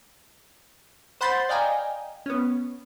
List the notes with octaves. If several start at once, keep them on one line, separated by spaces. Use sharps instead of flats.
C5 F#5 B5 C6 G6 A6
D5 D#5 F5 G5 G#5 A#5
B3 C#4